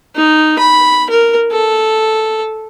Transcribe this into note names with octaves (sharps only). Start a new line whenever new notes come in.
D#4
B5
A#4
A4